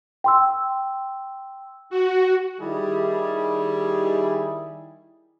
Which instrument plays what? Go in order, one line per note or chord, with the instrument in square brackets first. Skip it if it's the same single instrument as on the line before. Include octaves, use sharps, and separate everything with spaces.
[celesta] G5 C6 E6
[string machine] F#4
[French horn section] D#3 E4 [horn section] G3 G#4